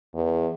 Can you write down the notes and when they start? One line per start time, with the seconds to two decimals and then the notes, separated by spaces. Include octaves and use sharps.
0.14 E2